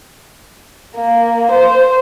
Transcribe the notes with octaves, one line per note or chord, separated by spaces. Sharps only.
A#3
C5